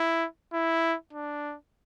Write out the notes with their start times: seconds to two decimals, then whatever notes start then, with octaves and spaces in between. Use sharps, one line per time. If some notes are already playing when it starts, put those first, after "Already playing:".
Already playing: E4
0.53 E4
1.13 D4